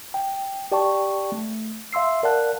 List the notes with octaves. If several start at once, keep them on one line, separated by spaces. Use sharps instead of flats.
G5
G4 D5 G5 A5 C#6
A3
E5 F5 C6 E6 C7
A#4 D5 F5 F#5 A5 F#6